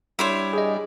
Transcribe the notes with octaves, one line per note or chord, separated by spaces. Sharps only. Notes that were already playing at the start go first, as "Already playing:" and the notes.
G3 D4 E4 C5 C#5
G#4 D#5